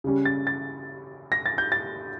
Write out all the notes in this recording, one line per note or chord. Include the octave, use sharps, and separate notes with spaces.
C#3 G3 C#4
A6
A6
A#6
A6
G6
A6